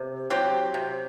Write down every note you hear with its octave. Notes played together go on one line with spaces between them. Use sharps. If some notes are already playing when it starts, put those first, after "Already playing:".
Already playing: C3
F#3 C4 G4
C3